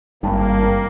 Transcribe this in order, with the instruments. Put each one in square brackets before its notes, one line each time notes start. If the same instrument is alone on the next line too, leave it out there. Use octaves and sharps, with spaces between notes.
[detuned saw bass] G#1 [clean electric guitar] G2 [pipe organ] A#3